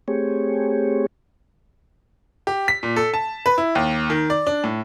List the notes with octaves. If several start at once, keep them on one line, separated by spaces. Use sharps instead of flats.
A3 C4 G4 G#4 C#5
G4
B6
A#2
A4
A5
B4
E4
D#2
D#3
D5
D4
A2